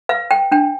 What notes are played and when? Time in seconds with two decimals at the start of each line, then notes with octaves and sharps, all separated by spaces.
0.09 B4 F5
0.31 G5
0.52 D4 G5